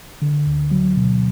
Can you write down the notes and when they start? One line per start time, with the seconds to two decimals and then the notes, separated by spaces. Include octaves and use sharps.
0.22 D3
0.47 D2
0.71 F#3
0.96 B2